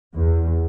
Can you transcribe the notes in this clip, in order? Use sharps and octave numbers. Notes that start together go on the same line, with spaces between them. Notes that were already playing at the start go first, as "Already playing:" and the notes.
E2